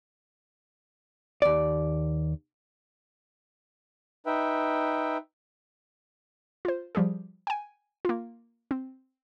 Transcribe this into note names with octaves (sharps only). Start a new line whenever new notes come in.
D#2 D5
D#4 B4 E5 G5
F4 C5
F3 G3 G4 G#4
G5 G#5
A#3 F4
C4